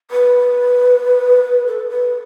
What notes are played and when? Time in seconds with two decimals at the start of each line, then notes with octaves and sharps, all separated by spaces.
0.11 B4
1.66 A4
1.89 B4